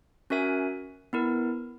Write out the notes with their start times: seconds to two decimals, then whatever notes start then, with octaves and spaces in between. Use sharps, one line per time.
0.30 C#4 F#4 A#4 E5 G#5
1.13 B3 E4 A#4